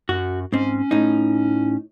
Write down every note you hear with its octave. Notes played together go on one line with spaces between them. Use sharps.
F#2 F#4
G#2 C4 C#4
A2 D#4